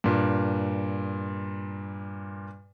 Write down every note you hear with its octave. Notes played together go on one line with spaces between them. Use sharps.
G2 A#2